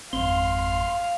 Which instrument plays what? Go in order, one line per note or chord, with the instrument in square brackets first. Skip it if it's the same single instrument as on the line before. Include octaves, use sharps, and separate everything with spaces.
[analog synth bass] G#1 [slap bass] F2 C4 [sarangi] F5 [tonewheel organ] C6